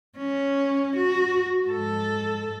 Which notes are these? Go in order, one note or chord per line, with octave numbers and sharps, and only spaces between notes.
C#4
F#4
G#2 A4